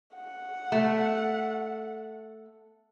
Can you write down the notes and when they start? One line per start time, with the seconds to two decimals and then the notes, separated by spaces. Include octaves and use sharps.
0.16 F#5
0.72 A3